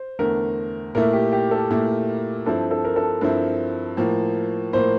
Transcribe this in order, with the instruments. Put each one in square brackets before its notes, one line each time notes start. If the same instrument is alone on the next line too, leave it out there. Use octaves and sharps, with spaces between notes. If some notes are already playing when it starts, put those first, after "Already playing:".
Already playing: [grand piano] C5
[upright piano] E2 D3 A3 [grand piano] A#4
[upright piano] A#2 A3 E4 [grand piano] A#4
[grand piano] G4
G4
A4
[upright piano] A#2 A3 E4
[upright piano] G2 F3 C4 E4 [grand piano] A4
[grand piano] A4
A#4
A4
[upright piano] G2 F3 C4 E4 [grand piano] A#4
[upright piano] A2 F3 A#3
[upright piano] A2 F3 A#3 [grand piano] C5